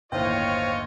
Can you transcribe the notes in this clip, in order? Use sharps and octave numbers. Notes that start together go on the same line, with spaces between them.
G1 D#2 A2 F4 C5 C#5 D#5 G5